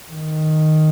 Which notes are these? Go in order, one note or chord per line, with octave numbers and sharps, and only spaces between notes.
D#3